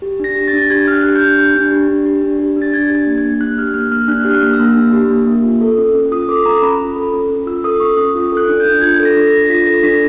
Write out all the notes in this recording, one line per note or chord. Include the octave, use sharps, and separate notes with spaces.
G4
D4 A#6
G4
A6
D4
G4 G#6
D4 F6
F#6
G4
G6
D4
G4
D4
G4
D4
G4
D4
G4
D4
A6
D4 G#6
G4
G#6
A#3
G#6
A#3
D4 F#6
G4 F6
A#3 F6
A#3 F6
D4 F#6
G4 F#6
F6
A#3
E6
A#3
D4
G4
A#3
A#3
F4
A4
C#4
C#4
F4 D#6
A4 D6
C#4 A#5
C#4 B5
F4
A4
C#4
C#4
F4 E6
A4 D#6
C#4 C#6
C#4 D#6
F4
A4 F#6
D4
G6
D4
F4 G#6
A4
A#6
D4
A#6
D4
A#6
F4 B6
A4 A#6
D4 B6